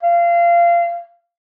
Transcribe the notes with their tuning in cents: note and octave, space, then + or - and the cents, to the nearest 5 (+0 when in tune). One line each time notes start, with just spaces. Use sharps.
F5 -25